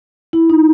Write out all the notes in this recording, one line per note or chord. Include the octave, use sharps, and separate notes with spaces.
E4
D#4